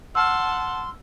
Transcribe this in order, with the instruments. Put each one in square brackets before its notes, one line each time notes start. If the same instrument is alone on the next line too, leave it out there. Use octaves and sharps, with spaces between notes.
[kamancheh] F#5 A5 [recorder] C6 [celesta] E6 F6